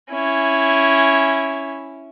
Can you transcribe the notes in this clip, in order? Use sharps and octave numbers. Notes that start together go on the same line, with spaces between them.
C#4 E4